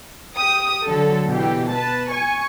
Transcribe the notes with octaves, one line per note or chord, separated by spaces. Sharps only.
G4 D#6
D3 F#3 A4
B2 E3 G4
B4 A5
G#5 C#6